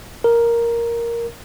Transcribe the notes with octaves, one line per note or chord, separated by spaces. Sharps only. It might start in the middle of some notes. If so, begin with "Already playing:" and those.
A#4